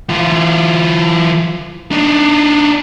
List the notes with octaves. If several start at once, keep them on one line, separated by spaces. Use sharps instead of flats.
E3 F4
D4 D#4